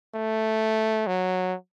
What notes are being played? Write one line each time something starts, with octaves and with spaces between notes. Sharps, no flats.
A3
F#3